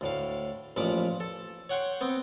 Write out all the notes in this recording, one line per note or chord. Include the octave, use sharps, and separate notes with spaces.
D2 A2 F5
A1 A#2 F3 B5 D6
A4
C#5 F#5 G5 C6 C#6
B3 C4 G5